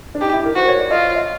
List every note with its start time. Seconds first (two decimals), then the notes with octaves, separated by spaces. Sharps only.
0.15 D4
0.21 D#4 G4
0.33 E4
0.45 A#4
0.56 F#4 C5
0.68 C#5
0.79 D5
0.91 F4 D#5
1.16 E5